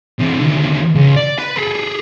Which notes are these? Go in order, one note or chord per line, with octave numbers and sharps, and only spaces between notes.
C3 E3
D#2 D3
C#2
D5
B4 B5
G#4 A4